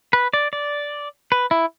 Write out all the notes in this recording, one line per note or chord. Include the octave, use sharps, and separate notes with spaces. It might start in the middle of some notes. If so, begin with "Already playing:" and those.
B4
D5
D5
B4
E4